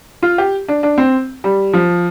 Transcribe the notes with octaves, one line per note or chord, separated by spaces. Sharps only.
F4
G4
D4
D4
C4
G3
F3